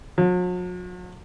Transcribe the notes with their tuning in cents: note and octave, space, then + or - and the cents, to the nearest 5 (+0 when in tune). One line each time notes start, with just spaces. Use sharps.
F#3 -45